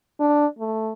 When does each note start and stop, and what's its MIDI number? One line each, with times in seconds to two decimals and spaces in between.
0.20 0.46 62
0.58 0.93 57